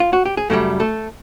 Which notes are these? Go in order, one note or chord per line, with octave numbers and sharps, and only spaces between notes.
F4
F#4
G4
G#4
F#2 C#3 E3 G3 A3 A4
A3 A4